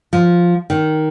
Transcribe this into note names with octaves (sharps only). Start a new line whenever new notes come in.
F3
D#3